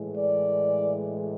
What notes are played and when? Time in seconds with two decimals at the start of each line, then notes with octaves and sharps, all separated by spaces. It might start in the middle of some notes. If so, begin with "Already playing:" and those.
Already playing: A2 E3 G#3
0.16 D5